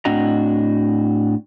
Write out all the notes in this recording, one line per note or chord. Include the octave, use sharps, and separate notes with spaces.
A2 C4 D4 F#4 D#5 A#5